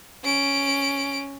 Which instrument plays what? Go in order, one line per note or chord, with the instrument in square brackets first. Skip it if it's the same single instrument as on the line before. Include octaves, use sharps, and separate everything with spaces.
[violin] C#4 D7